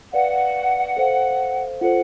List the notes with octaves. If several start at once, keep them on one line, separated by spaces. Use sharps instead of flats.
B4 D5 F5 F#5
A4 C5 F5
F4 A4 C5 F#5